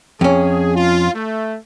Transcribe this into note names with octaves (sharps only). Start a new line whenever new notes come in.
F2 C#4 G#4
F4
A3